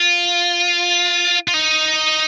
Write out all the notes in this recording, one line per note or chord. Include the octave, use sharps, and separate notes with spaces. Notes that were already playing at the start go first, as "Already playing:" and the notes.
Already playing: F4
F4
D#4